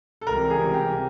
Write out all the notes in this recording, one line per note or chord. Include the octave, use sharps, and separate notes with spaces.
A4
C#2 C3 E3 G3 A#4
G#4
G4